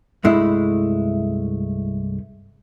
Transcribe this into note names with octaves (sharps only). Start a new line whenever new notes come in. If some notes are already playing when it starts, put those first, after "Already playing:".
C2 G2 G#3 A3 E4